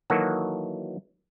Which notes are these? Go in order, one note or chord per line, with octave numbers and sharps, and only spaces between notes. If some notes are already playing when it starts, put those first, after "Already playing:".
D#3 E3 F#3 A#3 F#4 A4